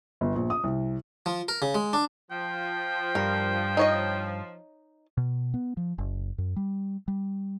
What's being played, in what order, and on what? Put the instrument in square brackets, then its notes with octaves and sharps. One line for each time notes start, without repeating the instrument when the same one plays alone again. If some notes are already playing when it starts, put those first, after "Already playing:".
[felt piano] G1
A#1
D#6
C2
[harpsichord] F3
A#4
C#3
G#3
D4
[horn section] F3 [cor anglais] G5
[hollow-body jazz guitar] G2 [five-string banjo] A#4
[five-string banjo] D#4 C#5 D#5
[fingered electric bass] B2
B3
F3
F#1
F#2
G3
G3